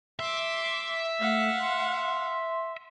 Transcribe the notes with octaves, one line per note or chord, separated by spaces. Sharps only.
E5 C6 D6
A3 F5 F#5
C6